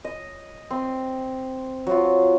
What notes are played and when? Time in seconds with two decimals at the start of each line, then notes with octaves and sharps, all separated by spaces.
0.05 D#5
0.71 C4
1.87 F#3 F4